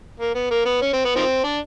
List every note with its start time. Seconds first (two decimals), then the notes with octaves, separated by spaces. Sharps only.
0.20 A#3
0.35 B3
0.51 A#3
0.66 B3
0.82 C#4
0.94 C4
1.05 B3
1.16 D#3 F3 C4
1.44 D4